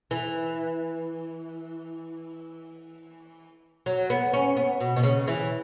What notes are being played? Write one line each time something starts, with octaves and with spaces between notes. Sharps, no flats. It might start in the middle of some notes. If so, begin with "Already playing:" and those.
E3
F#3
B3
C#4
B3
B2
B2
C#3
E3